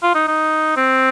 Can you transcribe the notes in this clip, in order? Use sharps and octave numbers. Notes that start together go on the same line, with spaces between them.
F4
D#4
D#4
C4